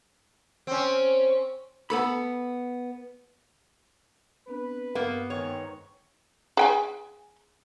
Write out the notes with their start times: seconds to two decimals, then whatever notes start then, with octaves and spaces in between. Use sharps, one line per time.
0.67 C4 C#4
1.90 B3 A4 B5
4.47 B3 C4 D4 B4
4.95 G2 A#3 B3
5.30 G#2 D#3 C#5 G5
6.57 G#4 G5 G#5